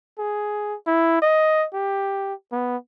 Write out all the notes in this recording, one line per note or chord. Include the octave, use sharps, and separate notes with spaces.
G#4
E4
D#5
G4
B3